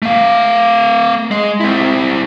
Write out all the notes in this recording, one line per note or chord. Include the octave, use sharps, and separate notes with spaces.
A3 F5
G#3
C4 E4